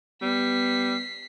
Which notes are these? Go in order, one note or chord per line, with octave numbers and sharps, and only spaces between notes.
G3 B3 B6 C7